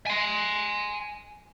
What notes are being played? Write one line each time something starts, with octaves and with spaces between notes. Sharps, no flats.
G#5 C6